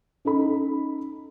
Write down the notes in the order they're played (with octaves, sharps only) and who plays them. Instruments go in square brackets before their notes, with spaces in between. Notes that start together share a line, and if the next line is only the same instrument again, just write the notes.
[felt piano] C#4 D#4 A4 B5